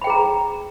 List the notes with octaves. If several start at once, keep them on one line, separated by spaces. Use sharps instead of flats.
G#4 G5 A#5 B5